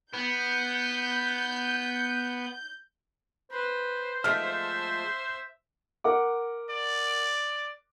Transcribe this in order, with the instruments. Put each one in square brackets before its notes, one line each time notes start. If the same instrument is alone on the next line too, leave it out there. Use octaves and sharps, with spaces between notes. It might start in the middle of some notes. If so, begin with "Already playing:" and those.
[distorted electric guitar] B3 [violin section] G6
[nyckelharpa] B4 [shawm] C5
[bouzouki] F3 G#3 A3 [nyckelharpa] E5 [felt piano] F6
[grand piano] A#4 F#5 D6
[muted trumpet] D5